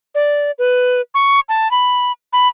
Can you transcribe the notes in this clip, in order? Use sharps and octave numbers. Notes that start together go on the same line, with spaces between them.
D5
B4
C#6
A5
B5
B5